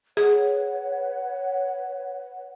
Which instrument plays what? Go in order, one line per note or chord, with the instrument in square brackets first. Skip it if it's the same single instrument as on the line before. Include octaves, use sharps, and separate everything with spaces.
[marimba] G#4 [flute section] B4 C#5 F#5